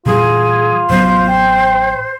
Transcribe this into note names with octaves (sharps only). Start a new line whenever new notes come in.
A#2 E3 G3 F4 G#4
A1 F#3 B3 C5
G5